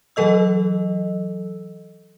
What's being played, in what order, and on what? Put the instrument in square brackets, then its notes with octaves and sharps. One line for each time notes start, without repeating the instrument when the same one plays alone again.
[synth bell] E3 F#3 A4 D#5 E6